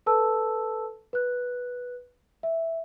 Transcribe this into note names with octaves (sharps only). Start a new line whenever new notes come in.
A4 B4 A5 E6
B4 F#6
E5